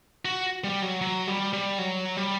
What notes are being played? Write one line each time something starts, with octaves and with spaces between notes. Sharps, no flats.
F#4
G3
F#3
F#3
G3
G3
F#3
G3